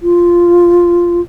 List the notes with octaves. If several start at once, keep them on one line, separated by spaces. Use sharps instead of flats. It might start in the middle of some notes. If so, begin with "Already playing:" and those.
F4